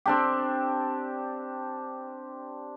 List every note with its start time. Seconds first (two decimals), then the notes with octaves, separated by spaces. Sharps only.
0.06 C4 D4 G4